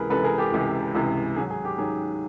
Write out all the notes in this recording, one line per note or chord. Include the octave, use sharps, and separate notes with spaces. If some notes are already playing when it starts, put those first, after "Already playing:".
Already playing: C#2 C3 E3 G#4 A#4 B4
C#2 C3 E3 A4 B4
G#4 A#4
G4 A4
C#2 C3 E3
C#2 C3 E3
G#2 D#3 F#3 G#4
G#4
G4
G#2 D#3 F#3 G#4